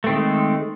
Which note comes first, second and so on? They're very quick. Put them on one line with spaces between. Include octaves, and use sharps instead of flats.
A3 C4 D#3 G#3